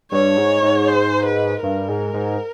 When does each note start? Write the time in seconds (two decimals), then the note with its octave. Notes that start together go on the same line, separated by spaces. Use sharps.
0.12 G2 C#5
0.37 G#2
0.62 G#2
0.88 C5
1.25 B4
1.63 G2 A#4
1.88 G#2
2.13 G#2